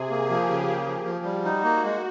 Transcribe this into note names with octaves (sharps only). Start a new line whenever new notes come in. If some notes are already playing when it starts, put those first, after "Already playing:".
Already playing: C3 G#4
A#3 G4
F3
C#3
A#3
F3
F3
G3 F#4
D#4
A#3
G#3